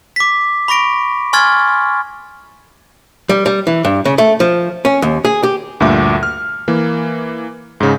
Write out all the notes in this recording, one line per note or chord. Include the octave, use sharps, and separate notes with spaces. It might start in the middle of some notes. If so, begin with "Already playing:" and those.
D6 B6
B5 C#6 A#6 D7
G#5 C6 C#6 F6 G#6 A6
G3
G3
E3
G2
C#3
A3
F3
C#4
D#2
G#4
G4
D2 G2 A#2 E5 D6
F6
E3 A#3
G#2 C#3